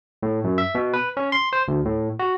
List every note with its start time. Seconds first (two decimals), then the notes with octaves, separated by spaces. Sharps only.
0.23 A2
0.44 F#2
0.58 E5
0.75 B2
0.94 B4
1.17 C#4
1.32 C6
1.53 C5
1.68 D2
1.85 A2
2.19 F#4